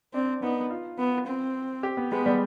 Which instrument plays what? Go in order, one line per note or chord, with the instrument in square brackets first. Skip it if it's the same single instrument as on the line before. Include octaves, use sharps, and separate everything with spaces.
[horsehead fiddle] C4 [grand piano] D4
[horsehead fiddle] B3 [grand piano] D#4
[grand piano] F4
[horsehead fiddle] B3
C4
[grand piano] G4
B3
[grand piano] G#3 [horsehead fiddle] B3
[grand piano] G3